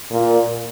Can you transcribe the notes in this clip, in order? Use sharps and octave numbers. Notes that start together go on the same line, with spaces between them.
A#2